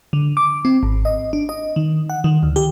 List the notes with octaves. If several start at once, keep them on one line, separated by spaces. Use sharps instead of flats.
D3
D6
C4
G#1
D#5
D4
D#5
D#3
F#5
D#3
D2
G4